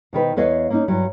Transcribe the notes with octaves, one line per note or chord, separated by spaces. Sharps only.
B2 D#3 B4 C5
E2 B4 C#5 D#5 F5
A#3 C#4 D#4
G2 F#3